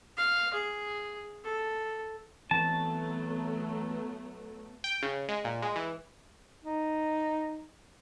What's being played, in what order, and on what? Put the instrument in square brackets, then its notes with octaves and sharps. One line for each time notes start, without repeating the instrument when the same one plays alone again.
[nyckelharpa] F5
G#4
A4
[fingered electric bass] E3 C4 [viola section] F#3 A3 B3 [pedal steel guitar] A5
[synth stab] G5
C#3
G#3
A#2
G#3
E3
[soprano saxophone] D#4